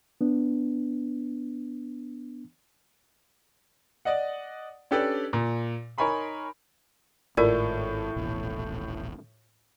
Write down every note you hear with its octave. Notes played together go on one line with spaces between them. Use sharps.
B3 D4
D5 D#5 F#5
C#4 D4 G4 A4 B4 D5
A#2
D#4 A#4 C#5 G#5 B5 C6
G#1 A2 F4 A#4 D5
D#1 A1 B2